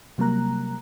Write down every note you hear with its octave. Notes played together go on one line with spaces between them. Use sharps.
C3 F#3 G3 A#3 A#5 F#6